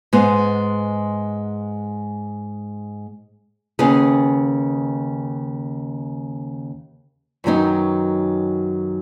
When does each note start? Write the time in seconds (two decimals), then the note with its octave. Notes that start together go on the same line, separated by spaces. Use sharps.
0.13 G#2 G#3 B3
3.79 D#2 C#3 B3 G#4
7.44 F#2 D#3 F#3 B3 D#4